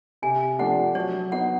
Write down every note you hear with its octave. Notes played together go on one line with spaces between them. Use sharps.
C3 G#5
F3 A3 D4 G4 F#5
F#3 C#5
B3 D#4 F#5